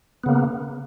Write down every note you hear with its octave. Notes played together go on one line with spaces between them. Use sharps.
C#3 A#3 B3